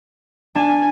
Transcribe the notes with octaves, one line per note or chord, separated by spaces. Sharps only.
D4 G#5 A5